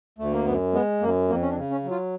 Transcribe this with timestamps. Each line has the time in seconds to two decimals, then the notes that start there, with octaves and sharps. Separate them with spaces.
0.18 D2 A3
0.32 A#3
0.45 F#2 B3
0.73 G#3 B3
1.01 F#2 A#3
1.28 F2 A#3
1.41 C#4
1.50 D4
1.56 C#3
1.70 C#4
1.84 F#3
1.91 F4